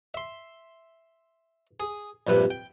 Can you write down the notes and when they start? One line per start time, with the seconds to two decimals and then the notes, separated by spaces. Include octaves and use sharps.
0.14 E5 C6
1.80 G#4
2.27 A#1 G2 C3 B4 E5
2.50 G5